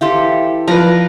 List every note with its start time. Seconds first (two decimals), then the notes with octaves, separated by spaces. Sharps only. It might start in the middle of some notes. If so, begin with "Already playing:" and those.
0.01 E3 G4 A4 E5 F5 C6
0.68 F3 B4 D5 A5 A#5